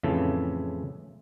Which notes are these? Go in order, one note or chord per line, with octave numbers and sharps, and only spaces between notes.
F2 A2 C#3 E3 A4